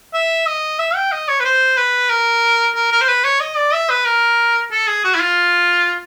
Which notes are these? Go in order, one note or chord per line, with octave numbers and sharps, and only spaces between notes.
E5
D#5
E5
G5
D#5
C#5
B4
C5
B4
A#4
A#4
A#4
C5
B4
C#5
D#5
D5
E5
B4
A#4
A4
G#4
F#4
E4
F4